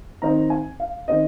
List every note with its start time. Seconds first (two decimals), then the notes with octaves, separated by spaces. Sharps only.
0.22 D#3 C4 D#4 A#5
0.50 G#5
0.80 F5
1.08 D#3 C4 D#4 D#5